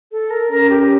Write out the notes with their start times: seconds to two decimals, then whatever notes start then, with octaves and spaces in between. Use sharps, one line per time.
0.12 A4
0.30 A#4
0.50 C#4 A#4
0.70 G4